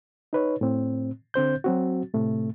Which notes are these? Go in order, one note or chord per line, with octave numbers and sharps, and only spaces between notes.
D#4 B4 C#5
A2 C4
D3 C4 C5 G6
F#3 C4 F#4
A2 C3 A3